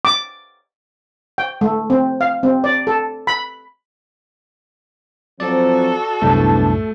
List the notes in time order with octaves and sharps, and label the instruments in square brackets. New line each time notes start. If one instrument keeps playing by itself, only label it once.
[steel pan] D6
G5
A3
C4
F5
C4
D5
A4
B5
[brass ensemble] F3 F#3 C4 [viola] F#4 A4 [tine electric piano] D5
[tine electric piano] C2 F#2 A2 [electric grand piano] A3 [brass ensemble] B3 D4 A5